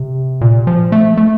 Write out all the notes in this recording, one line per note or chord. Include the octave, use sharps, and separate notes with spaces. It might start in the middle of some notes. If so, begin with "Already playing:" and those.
Already playing: C3
A#2
F3
A3
A3